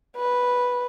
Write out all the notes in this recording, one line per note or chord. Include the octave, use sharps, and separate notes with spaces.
B4